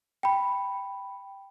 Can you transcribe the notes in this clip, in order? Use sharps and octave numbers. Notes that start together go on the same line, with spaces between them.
G5 B5